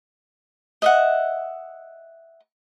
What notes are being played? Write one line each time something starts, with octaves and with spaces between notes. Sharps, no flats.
D#5 E5 F#5